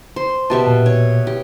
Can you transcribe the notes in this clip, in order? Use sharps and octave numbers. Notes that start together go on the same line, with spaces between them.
C5
B2 G4 E5 A5
A#2
C#5
G4